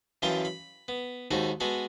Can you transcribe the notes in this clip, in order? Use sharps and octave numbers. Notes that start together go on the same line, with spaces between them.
F#2 E3 F4 G5 A5 D#6
B5
B3
D#2 G#2 D#4 F#4 A4
G#3 B3 F#4 A4